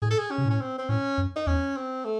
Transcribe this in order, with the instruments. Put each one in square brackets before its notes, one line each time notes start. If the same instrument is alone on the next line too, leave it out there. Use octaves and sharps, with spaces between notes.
[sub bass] A2 [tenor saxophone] G#4
[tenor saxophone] A4
G#4
C#4
[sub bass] C3
[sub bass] A2 [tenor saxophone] C#4
[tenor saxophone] C4
C4
[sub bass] A2 [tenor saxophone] C#4
[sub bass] F#2
[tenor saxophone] D#4
[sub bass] E2 [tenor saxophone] C#4
[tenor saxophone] C4
A3